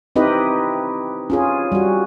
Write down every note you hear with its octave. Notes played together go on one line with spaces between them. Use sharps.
C4 D#4 E4 G4 B4 D#5
C#4 F4 G#4
G3 F#4